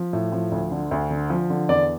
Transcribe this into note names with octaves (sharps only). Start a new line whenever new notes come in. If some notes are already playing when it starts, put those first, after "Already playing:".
Already playing: F3
A2
F3
D2
D3
D2
D3
F3
D3
E2 D5